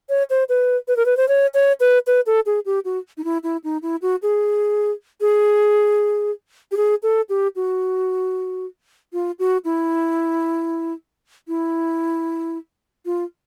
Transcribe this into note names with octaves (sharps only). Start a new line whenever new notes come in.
C#5
C5
B4
B4
A#4
B4
C5
C#5
C#5
B4
B4
A4
G#4
G4
F#4
D#4
E4
E4
D#4
E4
F#4
G#4
G#4
G4
G#4
A4
G4
F#4
F4
F#4
E4
E4
F4